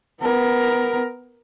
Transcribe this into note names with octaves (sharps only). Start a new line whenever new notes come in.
B3 A#4